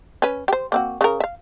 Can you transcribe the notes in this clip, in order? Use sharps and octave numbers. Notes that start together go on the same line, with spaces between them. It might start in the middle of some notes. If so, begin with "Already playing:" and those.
C#4 B4
G4 C5
A#3 C4 F#4
C#3 A#4
E5 F5